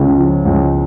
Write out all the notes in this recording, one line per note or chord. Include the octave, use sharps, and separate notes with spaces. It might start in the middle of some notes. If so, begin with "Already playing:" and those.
Already playing: C#2 C#3
F3
C#2